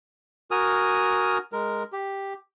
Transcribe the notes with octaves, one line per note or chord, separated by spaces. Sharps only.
F#4 A#4 G#5 D#6 F6
G#3 A#4
G4